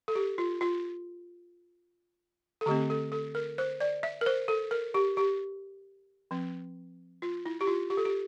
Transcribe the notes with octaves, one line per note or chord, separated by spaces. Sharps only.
A4
G4
F4
F4
A4
D3 A3 C4 G4
A4
A4
A#4
C5
D5
E5
A#4
C5
A4
A#4
G4
G4
F3 C4
F4
E4
G4
F4
G4
A4
G4